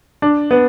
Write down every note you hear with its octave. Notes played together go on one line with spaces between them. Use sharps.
D4
B3